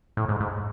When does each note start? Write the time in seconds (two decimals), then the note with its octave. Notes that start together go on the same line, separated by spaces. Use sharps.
0.17 A2
0.28 G#2
0.40 G#2